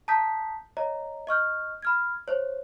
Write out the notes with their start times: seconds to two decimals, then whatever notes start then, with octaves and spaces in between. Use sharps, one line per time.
0.08 A5 A#5 D#6 G6 B6
0.77 C#5 D#5 A#5
1.27 D#5 C#6 F6 G6
1.82 B5 F6 G#6
2.28 C5 C#5